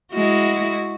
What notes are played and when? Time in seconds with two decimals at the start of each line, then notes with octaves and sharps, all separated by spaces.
0.13 G#3 E4 F#4